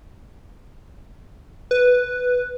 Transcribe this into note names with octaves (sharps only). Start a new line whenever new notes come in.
B4